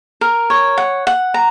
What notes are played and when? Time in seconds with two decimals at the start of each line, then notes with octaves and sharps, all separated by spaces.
0.21 A#4
0.50 C#5
0.78 F#5
1.07 F#5
1.34 A#5